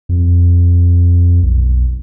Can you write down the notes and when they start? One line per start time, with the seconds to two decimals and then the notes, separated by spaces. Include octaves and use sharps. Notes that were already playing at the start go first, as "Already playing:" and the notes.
0.09 F2
1.43 B1